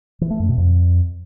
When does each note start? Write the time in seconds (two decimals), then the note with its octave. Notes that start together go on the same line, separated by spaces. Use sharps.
0.21 E3
0.30 A3
0.40 F#2
0.49 B2
0.58 F2